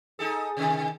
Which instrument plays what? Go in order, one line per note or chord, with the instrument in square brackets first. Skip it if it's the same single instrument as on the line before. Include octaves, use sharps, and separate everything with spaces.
[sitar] D#4 G#4 A4
C3 D#3